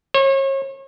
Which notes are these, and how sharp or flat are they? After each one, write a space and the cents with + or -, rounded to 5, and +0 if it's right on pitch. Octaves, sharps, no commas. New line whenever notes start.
C#5 -35